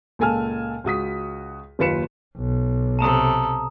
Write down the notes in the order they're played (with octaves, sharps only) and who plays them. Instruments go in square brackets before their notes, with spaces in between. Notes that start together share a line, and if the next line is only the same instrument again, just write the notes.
[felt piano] C#2 A#2 A4 G#5 A5 F6
C#2 F#4 D#6 B6
F#1 D#2 F4 B4 C#7 E7
[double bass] B1
[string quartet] C3 A4 [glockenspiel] A5 A#5 D#6